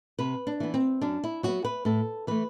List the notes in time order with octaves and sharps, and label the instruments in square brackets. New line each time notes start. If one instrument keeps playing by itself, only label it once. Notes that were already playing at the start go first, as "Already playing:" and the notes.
[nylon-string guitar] C3 B4
D4
E3 B3
C4
F#2 D4
E4
F#3 B3 F#4
B4
A2 A4
E3 A3 B4